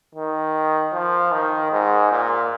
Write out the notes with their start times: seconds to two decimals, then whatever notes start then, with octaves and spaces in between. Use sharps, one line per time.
0.15 D#3
0.93 F3
1.32 D#3
1.72 G#2
2.11 A#2